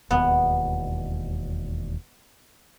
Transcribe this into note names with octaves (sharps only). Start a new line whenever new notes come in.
E1 D#2 B3